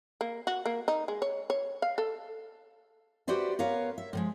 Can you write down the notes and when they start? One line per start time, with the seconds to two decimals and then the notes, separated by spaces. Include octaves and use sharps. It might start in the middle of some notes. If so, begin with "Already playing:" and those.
0.21 A#3
0.47 F#4
0.66 A#3
0.88 D#4
1.08 G#3
1.22 C#5
1.50 C#5
1.82 F5
1.98 A4
3.27 F#4 G4 B4 C5 D5 E5
3.59 B3 A#4 B4 C#5 F5
3.98 E5
4.13 A2 F3 G#3